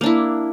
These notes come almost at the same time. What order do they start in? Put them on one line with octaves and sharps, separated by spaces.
A#3 D4 E4